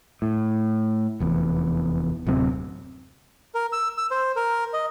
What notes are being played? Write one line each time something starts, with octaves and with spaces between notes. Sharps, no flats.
A2
F1 E2
D1 F#2 C3 C4
A#4
E6
E6
C5
A#4
D#5